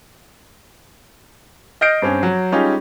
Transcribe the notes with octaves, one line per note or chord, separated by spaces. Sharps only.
D#5 F6 G6 A#6 C7 D7
G2 C4 C#4
F#3
G3 G#3 C#4 D#4 F4 G4